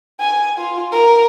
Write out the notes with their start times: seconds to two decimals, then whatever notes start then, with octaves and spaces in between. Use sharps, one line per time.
0.21 G#5
0.59 F4
0.92 A#4